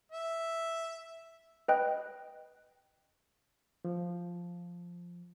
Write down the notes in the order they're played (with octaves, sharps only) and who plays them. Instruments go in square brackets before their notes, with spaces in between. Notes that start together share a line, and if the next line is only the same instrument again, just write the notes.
[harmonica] E5
[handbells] B4 D#5 G5 F#6
[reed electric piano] F3